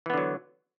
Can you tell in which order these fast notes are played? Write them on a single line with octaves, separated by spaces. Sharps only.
E3 B3 D3 F#3